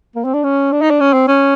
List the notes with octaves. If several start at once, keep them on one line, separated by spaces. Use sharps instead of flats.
A#3
C4
D4
C#4
D4
D#4
D4
C#4
C4
C#4